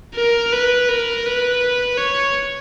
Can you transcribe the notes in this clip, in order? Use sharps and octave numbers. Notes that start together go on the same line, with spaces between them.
A#4
B4
A#4
B4
C#5